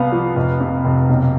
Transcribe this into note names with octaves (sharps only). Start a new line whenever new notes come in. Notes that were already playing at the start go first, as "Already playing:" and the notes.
Already playing: C2 B3 F5
F3
F1
C3
F1
B1